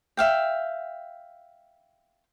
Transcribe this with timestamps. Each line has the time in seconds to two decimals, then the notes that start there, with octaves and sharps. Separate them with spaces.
0.17 E5 F5 G5